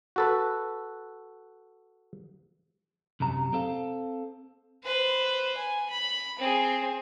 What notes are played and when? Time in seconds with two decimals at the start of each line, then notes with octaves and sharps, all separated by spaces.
0.16 F#4 A4 B4
3.20 C2 F#2 C3 A#5
3.53 C4 A4 F5
4.83 B4 C5
5.57 G#5
5.90 B5
6.38 C4 G#4